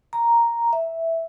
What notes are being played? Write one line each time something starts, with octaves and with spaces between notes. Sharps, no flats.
A#5
E5